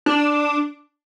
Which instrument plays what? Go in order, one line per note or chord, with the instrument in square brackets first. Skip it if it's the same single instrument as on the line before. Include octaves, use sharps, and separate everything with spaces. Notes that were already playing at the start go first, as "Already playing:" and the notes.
[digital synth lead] D4